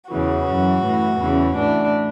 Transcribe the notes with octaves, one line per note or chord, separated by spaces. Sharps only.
E2 C#3 E3 F#4
F#2 E3
A2 E3
E2 C#3 E3
A2 E3 D4